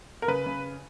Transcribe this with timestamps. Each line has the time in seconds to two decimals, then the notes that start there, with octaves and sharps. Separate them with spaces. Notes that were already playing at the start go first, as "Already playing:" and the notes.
0.22 A#4
0.28 C#3 B4
0.46 C#3